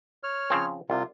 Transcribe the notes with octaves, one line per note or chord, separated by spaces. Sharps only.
C#5 F6
C#3 F3 C4
C2 C3 F4